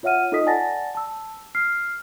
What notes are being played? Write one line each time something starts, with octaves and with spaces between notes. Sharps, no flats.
F4 C#5 E5 F#5 F6 D#7
D#4 F4 A4 D#5 D#6 B6
D5 F#5 G#5 A5 A6 A#6
A5 E6
F6 C7